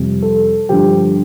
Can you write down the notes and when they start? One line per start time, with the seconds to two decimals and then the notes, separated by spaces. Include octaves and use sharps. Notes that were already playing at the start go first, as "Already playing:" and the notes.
Already playing: F2 C3 G3
0.22 A4
0.69 G2 D3 F3 G4